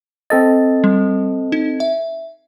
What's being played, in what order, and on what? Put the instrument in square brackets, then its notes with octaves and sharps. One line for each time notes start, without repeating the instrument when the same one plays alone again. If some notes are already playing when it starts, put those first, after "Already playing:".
[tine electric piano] C4 A4 D#5 [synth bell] A6
[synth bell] G3
D#4
E5